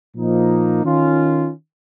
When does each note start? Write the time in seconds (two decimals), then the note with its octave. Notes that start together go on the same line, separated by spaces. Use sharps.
0.15 A#2 F3 A#3 D#4
0.84 D#3 C#4 F4